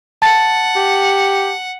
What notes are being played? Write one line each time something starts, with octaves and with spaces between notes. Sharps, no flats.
F#5 A5 A6
G4